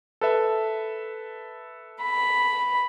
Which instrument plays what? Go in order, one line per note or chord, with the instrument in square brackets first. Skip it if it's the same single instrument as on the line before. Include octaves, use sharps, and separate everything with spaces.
[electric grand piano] A4 B4 E5
[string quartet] B5